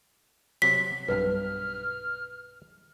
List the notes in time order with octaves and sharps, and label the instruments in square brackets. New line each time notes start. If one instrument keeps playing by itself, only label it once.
[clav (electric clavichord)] C3 F#3 [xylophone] B6
[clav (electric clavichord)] B1 G2 [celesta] B4 [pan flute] F6